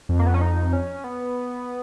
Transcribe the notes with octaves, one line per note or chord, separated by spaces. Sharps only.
F2
A#3
B3
C#4
D#4
C#4
B3